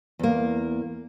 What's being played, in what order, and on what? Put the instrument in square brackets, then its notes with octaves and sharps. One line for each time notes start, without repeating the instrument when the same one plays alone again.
[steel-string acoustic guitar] E2 A#3